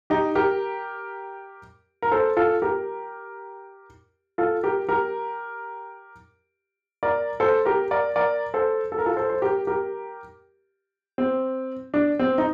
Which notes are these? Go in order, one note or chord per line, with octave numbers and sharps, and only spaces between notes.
D#4 G4
G4 A#4
A#4
A4 C5
F4 A4
G4 A#4
F4 A4
G4 A#4
G4 A#4
A#4 D5
A4 C5
G4 A#4
A#4 D5
A#4 D5
A4 C5
A4
A#4
F4 A4
A4 C5
C5
G4 A#4
G4 A#4
C4
D4
C4
D#4